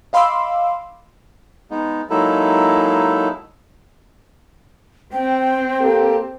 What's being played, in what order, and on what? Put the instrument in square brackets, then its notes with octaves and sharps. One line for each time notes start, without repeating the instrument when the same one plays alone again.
[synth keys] D#5 F5 B5 C6 D6 E6
[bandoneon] G#3 B3 D#4
F#3 G#3 A#3 D#4 E4 A4
[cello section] C4 [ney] G5
[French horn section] A#3 G4 A4